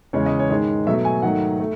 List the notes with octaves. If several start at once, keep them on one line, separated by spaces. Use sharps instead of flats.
E2 C#3 G#3 C#5
D#5
C#5
G#2 D#3 G#3
B2 F#3 A3 E5
G#5
G#2 D#3 F#3 A3 F#5
A3